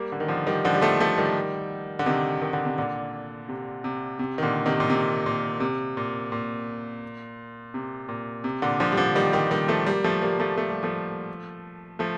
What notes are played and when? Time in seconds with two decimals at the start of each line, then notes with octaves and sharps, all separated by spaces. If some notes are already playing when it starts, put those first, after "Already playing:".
Already playing: G3 A#3
0.12 D3
0.20 D#3
0.28 D3 F3
0.47 D#3 G3
0.65 D3 F3
0.74 G3
0.82 F3 A3
1.00 F3 A3
1.18 D#3 G3
1.99 D3
2.06 C3 D#3
2.42 D#3
2.53 D3
2.65 C3
2.78 A#2 D3
3.49 C3
3.84 C3
4.19 C3
4.38 D#3
4.42 A#2 D3
4.66 C3 D#3
4.80 A#2
4.90 C3
5.26 A#2
5.60 C3
5.97 A#2
6.32 A#2
7.74 C3
8.09 A#2
8.44 C3
8.62 A#2 D3
8.80 D3 F3
8.92 G3
8.97 D3 F3
9.15 D#3 G3
9.33 D#3 G3
9.51 D#3 G3
9.68 F3 A3
9.86 G3 A#3
10.04 F3 A3
10.22 G3 A#3
10.40 F3 A3
10.57 A3
10.70 G3
10.83 F3 A3
11.99 F3 A3